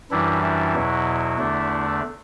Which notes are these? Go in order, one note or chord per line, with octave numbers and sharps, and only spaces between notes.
F#2 E3 G3 D4 E4
E4
E2 B2 F#3
E2 D3 A3 D4